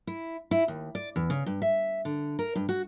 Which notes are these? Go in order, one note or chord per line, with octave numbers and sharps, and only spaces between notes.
E4
E4
D#2
D5
E2
C#3
G2
E5
D3
A#4
G2
F#4